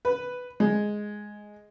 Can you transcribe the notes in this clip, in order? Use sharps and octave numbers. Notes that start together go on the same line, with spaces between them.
B4
G#3